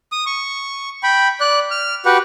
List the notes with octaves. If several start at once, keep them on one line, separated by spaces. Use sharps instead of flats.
D#6
C#6
G5 B5
D5 F#6
F6
F#4 G4 B4 F#5